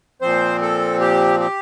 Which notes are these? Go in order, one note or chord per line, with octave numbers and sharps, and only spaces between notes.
A#2 F3 C4 C5
A4
G4
G4